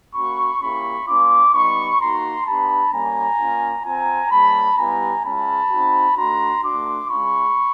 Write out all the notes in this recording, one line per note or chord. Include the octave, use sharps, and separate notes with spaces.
A#3 C#4 F#4 B5 C#6
A#3 C#4 E4 G4 B5 C#6
A#3 C#4 F4 C6 D6
G3 B3 D#4 B5 C#6
A#3 D#4 F#4 A#5 C6
B3 D4 G4 A5 B5
G3 A#3 C#4 G#5 A#5
A#3 C#4 F4
C4 F4 G#5 A#5
G3 A#3 C#4 A5 B5
G3 B3 E4 G4 G#5 A#5
G#3 C#4 F4 A5 B5
C4 D#4 F#4
A3 D4 F#4 A#5 C6
A3 D4 F#4 C6 D6
G#3 C#4 F4 B5 C#6